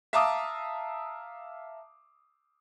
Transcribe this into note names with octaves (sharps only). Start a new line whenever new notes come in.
E5 F5 A5 A#5 D6 D#6